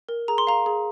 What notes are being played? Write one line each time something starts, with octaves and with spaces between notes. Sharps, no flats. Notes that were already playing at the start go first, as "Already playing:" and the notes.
A#4
G#4 A#5
C6
F5 A#5
G#4